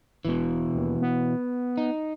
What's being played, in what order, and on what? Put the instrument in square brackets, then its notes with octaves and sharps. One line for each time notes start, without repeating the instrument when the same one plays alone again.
[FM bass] E1 [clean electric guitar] B2 E3
[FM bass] D#2
B3
[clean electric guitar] D#4